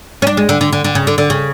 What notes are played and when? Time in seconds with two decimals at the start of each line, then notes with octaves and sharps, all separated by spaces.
0.22 C#4
0.27 D4
0.37 G#3
0.49 D3
0.61 D3
0.73 D3
0.84 D3
0.95 C#3
1.07 D3
1.18 D3
1.30 C#3